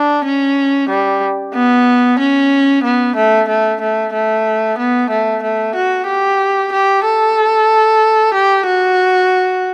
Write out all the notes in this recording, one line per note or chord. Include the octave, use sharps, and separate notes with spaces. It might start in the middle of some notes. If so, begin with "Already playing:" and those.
Already playing: D4
C#4
G3
B3
C#4
B3
A3
A3
A3
A3
B3
A3
A3
F#4
G4
G4
A4
G4
F#4